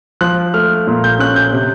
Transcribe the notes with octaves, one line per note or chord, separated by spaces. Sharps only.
F3 F#6
A3 F6
A#2
G6
C#4 F#6
G6
C3